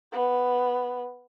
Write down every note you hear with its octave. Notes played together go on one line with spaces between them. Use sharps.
B3